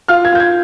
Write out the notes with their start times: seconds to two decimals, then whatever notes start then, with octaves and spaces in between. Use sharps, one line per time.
0.08 F4 F6
0.25 G#6
0.33 F4 G6
0.40 G#6